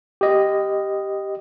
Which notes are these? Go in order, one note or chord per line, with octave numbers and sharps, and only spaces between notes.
G4 D#5